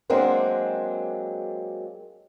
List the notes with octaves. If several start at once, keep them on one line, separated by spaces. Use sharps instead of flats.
F#3 G#3 A#3 C4 D4